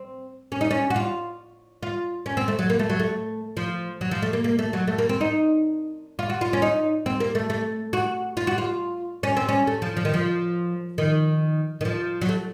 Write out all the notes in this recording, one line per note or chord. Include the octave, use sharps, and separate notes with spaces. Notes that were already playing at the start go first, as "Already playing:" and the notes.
Already playing: C4
C#4
D#4
C#4
F#4
F4
F4
C#4
C4
A3
F#3
A#3
A3
F#3
A3
F3
F#3
F3
A3
A#3
A#3
A3
F#3
A3
A#3
C4
D#4
F4
F#4
F4
C#4
D#4
C4
A#3
A3
A3
F#4
F4
F#4
F4
C#4
C4
C#4
A3
F3
F3
D#3
F3
D#3
D#3
F3
F#3
A3